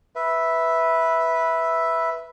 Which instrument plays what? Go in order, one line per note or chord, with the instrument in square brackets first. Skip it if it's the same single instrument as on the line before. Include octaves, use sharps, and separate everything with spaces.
[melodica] B4 E5